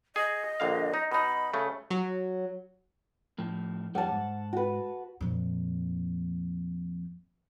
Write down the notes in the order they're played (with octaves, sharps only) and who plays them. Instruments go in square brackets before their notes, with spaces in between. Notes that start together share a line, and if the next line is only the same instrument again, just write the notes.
[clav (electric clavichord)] G#4 [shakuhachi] D#5
[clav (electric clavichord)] A#1 D3 F5
D#4
[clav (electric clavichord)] B2 D#4 [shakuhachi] B5
[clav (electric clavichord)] C#3 A3
[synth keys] F#3
[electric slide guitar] A2 F3
[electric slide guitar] F2 G3 [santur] F#5 A5
[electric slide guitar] G#2
[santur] F#4 B4
[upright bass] F2 A#2